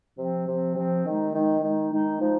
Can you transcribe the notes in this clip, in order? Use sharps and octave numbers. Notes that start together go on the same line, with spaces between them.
C3 F3 C4
C3 F3 C4
C3 F3 C4
D#3 G#3 D#4
D#3 G#3 D#4
D#3 G#3 D#4
D#3 G#3 D#4
F3 G#3 D#4